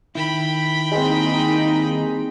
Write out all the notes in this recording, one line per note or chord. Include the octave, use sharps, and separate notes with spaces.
D#3 E4 G5 B5
G3 G#3 A#3 C4 D#4